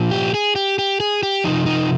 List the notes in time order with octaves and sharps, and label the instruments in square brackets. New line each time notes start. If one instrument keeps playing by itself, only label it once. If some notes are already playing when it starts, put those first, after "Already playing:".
Already playing: [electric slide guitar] A#2 F3
G4
G#4
G4
G4
G#4
G4
C3 F3 D#4
D#4